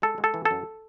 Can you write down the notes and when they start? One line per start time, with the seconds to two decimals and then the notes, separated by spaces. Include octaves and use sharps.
0.02 G#3 A4
0.18 G#3
0.24 A4
0.34 E3
0.45 A4
0.51 F#2